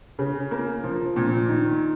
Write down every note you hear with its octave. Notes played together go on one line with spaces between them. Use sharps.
C#3
A#3
F3
A#2
D#3